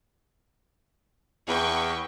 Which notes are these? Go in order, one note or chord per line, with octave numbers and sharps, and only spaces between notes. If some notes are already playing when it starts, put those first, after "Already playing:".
E2 B4 G5 C#6